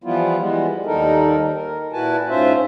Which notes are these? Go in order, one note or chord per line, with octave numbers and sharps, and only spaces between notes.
E3 F3 G3 B3 E4 F4
E3 G3 G#3 B3
D#2 D#3 G3 D#4 A4 A#4
A#4
A#2 E4 F#4 B4 G#5 A5
G#2 C#4 F4 C5 E5